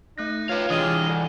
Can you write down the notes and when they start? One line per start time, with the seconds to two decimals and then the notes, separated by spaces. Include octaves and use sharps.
0.18 A3 D#4 F#6 A#6
0.49 F4 B4 C#5 F5
0.70 E3 G#3 D4 G4 D#5 D#6 F6
1.08 D3